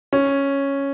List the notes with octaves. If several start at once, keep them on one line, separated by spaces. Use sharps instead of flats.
C#4